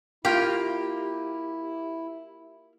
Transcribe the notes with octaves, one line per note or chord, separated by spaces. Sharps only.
A#3 E4 F4 G4